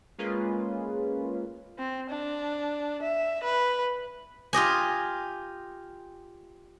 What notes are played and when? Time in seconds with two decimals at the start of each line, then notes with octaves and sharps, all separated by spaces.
0.18 G#3 A#3 C#4 F4 G#4 B4
1.79 C4
2.10 D4
3.03 E5
3.44 B4
4.53 F4 G4 D#5 G#5